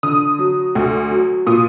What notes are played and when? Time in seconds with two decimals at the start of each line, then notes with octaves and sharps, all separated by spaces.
0.03 D3 D#6
0.39 F#3
0.75 D2
1.11 F#3
1.47 A#2 D#6